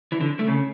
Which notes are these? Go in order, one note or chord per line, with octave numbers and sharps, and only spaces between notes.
E3
D3
A3
C#3